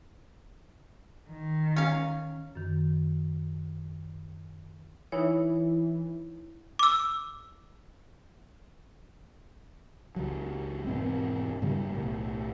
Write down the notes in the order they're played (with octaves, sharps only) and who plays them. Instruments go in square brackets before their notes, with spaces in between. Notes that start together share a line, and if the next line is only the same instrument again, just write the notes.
[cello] D#3
[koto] C#4 F5
[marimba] F#2 D#3
[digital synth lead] E3 [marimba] D#4 E4 C#5
[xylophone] D6 E6
[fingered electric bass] C#2 F#3
E1 G#2 C4
G2 C#3 F#3 G3
B1 A2